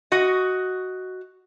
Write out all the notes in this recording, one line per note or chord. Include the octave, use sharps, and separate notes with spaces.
F#4 D#5